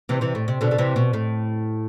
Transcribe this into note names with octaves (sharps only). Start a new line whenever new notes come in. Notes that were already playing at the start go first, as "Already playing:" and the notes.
C3 E3
C3 E3
A2
C3
B2 D3
D3
C3 E3
B2
A2